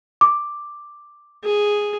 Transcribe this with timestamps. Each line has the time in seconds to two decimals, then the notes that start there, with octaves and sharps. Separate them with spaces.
0.21 D6
1.44 G#4